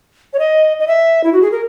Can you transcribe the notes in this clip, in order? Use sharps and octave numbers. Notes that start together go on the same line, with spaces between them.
C#5
D#5
D#5
E5
E4
F#4
G#4
A#4